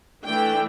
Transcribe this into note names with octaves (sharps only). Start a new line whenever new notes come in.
E3 A3 D4 G5